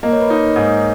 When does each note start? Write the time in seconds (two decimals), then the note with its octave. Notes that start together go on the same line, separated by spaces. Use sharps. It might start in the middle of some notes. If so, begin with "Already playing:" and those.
0.03 A#3 D#5
0.13 C#5
0.21 B4
0.29 D#4 C#5
0.56 G#2